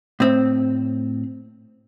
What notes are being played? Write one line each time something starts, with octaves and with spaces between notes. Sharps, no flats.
A2 C4